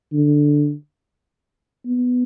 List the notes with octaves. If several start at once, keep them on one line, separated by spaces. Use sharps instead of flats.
D3
B3